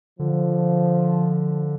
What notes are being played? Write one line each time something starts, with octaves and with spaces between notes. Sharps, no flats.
D3 F3